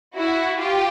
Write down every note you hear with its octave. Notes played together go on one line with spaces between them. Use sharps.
E4 F#4
F4 G4